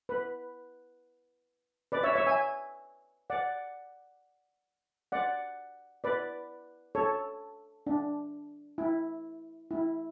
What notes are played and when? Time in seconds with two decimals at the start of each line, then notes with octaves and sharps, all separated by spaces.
0.09 B4
1.92 B4 D5
2.03 C#5 E5
2.15 C#5 E5
2.27 E5 G#5
3.30 D5 F#5
5.12 D5 F#5
6.04 B4 D5
6.95 A4 C#5
7.87 D4
8.78 E4
9.71 E4